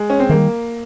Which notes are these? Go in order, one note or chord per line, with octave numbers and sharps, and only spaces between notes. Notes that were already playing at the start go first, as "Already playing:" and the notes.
Already playing: G#3
C#4
C4
D#3 G3 A#3